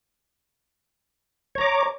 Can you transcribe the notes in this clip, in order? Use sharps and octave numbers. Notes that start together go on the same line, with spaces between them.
C#5 A#5 D6